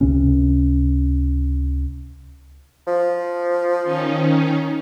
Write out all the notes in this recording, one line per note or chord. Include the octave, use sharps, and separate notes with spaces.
C#2 C3 C#4
F3
D#3 C#4 D#4